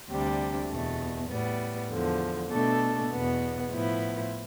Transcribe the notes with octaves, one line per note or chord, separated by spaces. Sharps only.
D2 C3 G3 D4
E2 B2 A3
A2 G3 B3
E2 D3 F3
B2 A3 D4 A4
E2 B2 B3
A2 F3 B3 E4